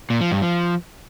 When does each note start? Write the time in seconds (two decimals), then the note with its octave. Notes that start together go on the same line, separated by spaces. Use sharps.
0.10 A#2
0.21 F3
0.31 G2
0.42 F3